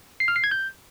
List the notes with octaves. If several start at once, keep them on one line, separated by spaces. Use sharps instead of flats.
C7
F6
C7
G#6
G6